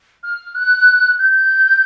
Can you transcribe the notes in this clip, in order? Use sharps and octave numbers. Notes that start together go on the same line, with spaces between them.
F6
F#6
G6